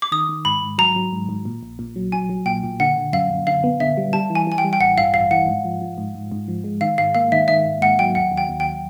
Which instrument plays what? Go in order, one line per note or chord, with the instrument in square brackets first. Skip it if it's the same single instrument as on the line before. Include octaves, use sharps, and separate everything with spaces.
[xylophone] D6
[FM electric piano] D#3 [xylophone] D#6
[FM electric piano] D#3
[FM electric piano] G#2 [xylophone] B5
[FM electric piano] G#2
[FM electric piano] F#3 [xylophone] A#5
[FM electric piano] F#3
G#2
G#2
A#2
A#1
A#2
F#3
[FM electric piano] F#3 [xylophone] G#5
[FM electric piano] F#3
[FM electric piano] A#2 [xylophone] G5
[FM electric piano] A#2
[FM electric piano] D3 [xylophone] F#5
[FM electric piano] D3
[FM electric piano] F#2 [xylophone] F5
[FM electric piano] F#2
[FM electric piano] D3 [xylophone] F5
[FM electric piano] B3
[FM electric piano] D3 [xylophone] E5
[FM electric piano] G3
[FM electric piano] G3 [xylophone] A5
[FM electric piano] E3
[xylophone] G#5
[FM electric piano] E3 [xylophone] G#5
[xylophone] G5
[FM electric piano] G3
[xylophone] G5
[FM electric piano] A1 [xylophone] F#5
[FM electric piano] G2 [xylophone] F5
[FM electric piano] A1 [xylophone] F5
[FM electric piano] E3 [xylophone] F#5
[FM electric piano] G#2
F3
F3
G#2
G#2
G#2
F3
G#3
[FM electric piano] D#3 [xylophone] F5
[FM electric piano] G#2 [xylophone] F5
[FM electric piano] A#3 [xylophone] F5
[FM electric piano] D#3 [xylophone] E5
[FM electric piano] D#3 [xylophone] E5
[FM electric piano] G#2
[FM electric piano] G#2 [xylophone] F#5
[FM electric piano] F#3 [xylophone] G5
[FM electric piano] D#2 [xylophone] F#5
[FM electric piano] D#2
[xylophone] G5
[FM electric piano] D#2
[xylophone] G5